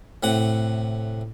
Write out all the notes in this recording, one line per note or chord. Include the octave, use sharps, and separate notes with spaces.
A2 C3 F#5